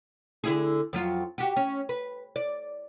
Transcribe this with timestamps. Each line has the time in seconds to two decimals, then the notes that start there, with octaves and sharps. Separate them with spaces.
0.44 D3 E4 G#4
0.93 F2 F#3 F4
1.38 F#4 G4
1.56 C#4
1.89 B4
2.36 D5